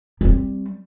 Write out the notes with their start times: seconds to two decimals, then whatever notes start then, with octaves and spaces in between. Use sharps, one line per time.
0.21 G3 C4